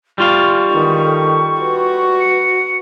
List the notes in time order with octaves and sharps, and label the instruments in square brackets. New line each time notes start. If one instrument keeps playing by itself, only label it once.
[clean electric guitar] G3 F4 F5 [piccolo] C#6
[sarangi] D#3 [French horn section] E3 G#3 B3
[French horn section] A4
[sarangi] F#4 [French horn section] B4
[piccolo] C#7